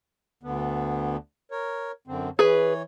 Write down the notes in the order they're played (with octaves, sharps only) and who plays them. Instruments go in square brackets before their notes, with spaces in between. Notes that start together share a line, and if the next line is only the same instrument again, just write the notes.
[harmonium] D2 D3 B3
A#4 C#5
F#2 D3 C4
[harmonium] E3 C#5 [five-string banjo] G#4 B4